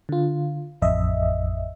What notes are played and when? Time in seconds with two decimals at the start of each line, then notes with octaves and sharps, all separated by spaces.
0.09 D3 F4
0.82 A1 F2 D#5 E5